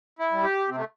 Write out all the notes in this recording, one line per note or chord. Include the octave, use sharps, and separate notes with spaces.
E4
G3
G4
C3 C4
A3